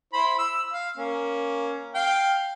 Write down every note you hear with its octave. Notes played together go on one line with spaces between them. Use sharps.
E4 C5 B5
E6
F5
A#3 C#4
F5 G5